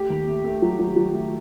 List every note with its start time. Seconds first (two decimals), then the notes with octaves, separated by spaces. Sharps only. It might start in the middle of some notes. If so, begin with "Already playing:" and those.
Already playing: A3 G4
0.10 D#2
0.27 A3
0.44 A3
0.62 F#3
0.79 F#3
0.96 F#3
1.14 A3